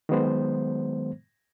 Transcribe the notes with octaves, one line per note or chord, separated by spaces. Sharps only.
D#3 F#3 G#3 B3 C5